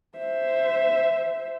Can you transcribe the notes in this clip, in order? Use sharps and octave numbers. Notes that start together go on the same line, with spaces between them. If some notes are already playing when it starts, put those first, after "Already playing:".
C5 E5